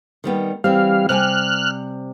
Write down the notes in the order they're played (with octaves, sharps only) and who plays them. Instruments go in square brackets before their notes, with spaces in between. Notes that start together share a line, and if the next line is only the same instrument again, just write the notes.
[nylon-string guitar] D#3 G3 B3
[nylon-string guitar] E3 C4 [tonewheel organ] G3 F5
[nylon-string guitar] C3 G3 G#5 [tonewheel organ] F6 F#6